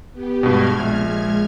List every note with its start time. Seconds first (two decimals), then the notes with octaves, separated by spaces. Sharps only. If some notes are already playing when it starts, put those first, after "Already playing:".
0.12 B3 G4
0.43 G2 B2 G#3 F6 G#6
0.80 A#1